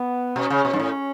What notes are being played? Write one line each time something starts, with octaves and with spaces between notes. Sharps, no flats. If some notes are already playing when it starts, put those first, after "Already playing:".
Already playing: B3
B2 C#4
C#3
B2
G2
A2